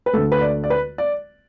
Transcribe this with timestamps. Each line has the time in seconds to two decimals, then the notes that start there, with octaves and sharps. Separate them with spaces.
0.06 B4
0.13 D2 D3 A3 A4
0.32 B4
0.41 D5
0.64 D5
0.70 B4
0.98 D5